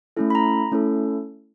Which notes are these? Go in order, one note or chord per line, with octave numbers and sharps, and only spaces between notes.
A3 C#4 E4 A4
B5
A#5
A3 C#4 E4 A4